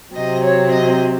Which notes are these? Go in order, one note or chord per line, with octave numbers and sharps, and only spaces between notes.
C3 F#3 C4 D#5
C#5
D#5